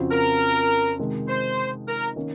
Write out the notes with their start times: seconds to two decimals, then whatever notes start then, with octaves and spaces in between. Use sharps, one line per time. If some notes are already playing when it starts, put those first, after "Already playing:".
Already playing: F2 C#3 F3 C4 F#4
0.11 A#4
0.99 C3 D#3 G#3
1.28 C5
1.87 A#4
2.16 D#3 A#3 C#4